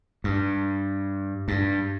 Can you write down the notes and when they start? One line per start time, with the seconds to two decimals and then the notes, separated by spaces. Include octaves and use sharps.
0.24 G2
1.48 G2